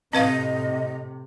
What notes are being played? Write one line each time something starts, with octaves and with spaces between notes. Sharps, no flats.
A2 C3 C4 B4 D#5 F5